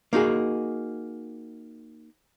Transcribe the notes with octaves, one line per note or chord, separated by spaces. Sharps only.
A#3 D#4 F#4 G#4